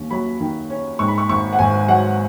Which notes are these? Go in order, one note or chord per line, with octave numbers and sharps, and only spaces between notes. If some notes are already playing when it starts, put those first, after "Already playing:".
Already playing: D#2 C#4
F#3 B5
D#3
C#4
G#2 C#6
B5
C#6
G#1 C#6
F#5
G#1 G#5
F#3 F#5